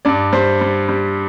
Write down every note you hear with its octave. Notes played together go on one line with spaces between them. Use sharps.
G2 D5
G3 C5
G3
G3